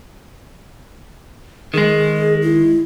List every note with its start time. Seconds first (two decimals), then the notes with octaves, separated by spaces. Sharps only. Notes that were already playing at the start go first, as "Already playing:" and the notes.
1.74 D#3 G#3 G#4
2.42 E4